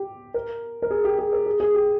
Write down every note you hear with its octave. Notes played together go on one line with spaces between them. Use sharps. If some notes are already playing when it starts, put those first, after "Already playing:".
Already playing: G4
A#4
A#4
G#4
G4
G#4
A#4
G#4
G#4
G4